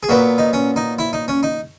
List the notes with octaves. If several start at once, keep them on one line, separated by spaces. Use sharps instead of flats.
G#4
A#2 F#3 B3 F#4
D#4
C#4
D#4
E4
D#4
C#4
D#4